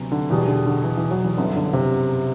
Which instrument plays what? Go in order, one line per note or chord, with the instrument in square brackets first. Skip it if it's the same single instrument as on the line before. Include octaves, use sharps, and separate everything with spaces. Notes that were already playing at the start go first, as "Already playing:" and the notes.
Already playing: [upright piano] D2 C3 F#3 B3
[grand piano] D3
[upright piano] E2 B2 G3 D4 G4 [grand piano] E3
[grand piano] D3
D3
E3
E3
F#3
E3
[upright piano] G1 F#2 E3 B3 [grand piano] D3
[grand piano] D3
C3